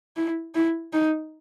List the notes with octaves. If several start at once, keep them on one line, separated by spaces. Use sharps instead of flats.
E4
E4
D#4